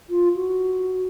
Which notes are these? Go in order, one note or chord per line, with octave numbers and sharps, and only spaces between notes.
F4
F#4